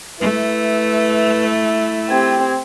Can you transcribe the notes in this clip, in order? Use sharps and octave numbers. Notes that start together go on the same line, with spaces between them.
A3 E4 B4
C4 G4 G#6